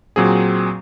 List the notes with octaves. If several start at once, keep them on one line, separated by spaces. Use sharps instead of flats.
A#2 F#3 C4 G#4